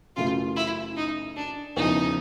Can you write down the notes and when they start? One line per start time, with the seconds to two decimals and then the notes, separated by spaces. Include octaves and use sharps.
0.16 F#2 C#3 E3 A3 F4
0.56 E4
0.97 D#4
1.36 D4
1.76 E2 C#3 F3 D#4